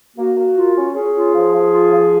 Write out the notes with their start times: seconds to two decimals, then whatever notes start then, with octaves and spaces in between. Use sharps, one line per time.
0.17 A#3 F#4
0.36 A#3
0.56 F4
0.76 C#4
0.94 C#4 G#4
1.14 F4
1.33 F3
1.53 F3
1.71 F4
1.91 F3